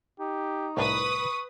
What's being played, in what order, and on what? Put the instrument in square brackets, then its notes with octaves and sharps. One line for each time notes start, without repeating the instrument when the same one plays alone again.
[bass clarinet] D#4 [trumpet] G4
[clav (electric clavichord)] C2 A2 D4 [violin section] B4 D#6 [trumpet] C#6